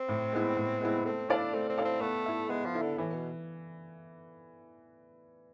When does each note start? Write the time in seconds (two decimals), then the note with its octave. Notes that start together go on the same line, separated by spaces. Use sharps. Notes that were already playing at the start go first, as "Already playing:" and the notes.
Already playing: C4
0.09 A2
0.33 G#3 B3 E4
0.57 A2
0.81 G#3 B3 E4
1.05 A3 C4
1.29 D4 E4 A4 D5 F5
1.53 A3 C4
1.70 C4
1.78 E4 A4 D5 F5
1.85 C4
2.01 A3 B3
2.26 E4 A4 E5
2.49 G#3 B3
2.66 F3
2.74 E4 A4 E5
2.82 D3
2.98 A2 E3
3.14 B2